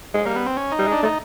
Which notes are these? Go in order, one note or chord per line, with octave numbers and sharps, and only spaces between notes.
G#3
G3 A#3
B3
C4
C#4
D#4
G3
G#3
D4
A3 D#4